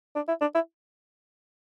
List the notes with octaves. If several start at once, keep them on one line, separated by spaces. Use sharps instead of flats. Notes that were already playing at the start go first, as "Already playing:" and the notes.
D4
E4
D4
E4